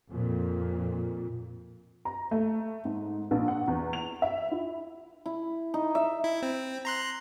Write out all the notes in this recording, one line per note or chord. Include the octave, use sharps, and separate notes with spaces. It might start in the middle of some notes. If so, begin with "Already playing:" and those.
F2 A#2
A#5
A3
G#2
A#1
F#5
E2
F7
E5
E4
E4
D#4
E5
E4
C4
A#5 C6 F#6